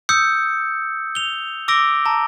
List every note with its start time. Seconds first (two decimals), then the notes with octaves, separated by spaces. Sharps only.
0.09 D#6 E6 G6 C#7
1.15 F7 G7
1.68 D6 E6 A#6 D7 G7
2.06 A5 A#5